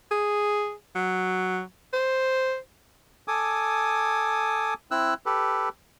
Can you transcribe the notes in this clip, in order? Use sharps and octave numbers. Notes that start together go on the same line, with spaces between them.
G#4
F#3
C5
A4 G#5 D6 D#6
C4 E4 E6 F#6
G4 A4 B4